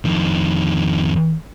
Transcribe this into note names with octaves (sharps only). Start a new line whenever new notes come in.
F2 D#3